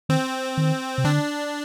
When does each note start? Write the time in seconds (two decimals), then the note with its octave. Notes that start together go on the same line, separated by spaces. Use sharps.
0.09 D#3 C4
0.57 D#3
0.98 C3
1.04 D3 D4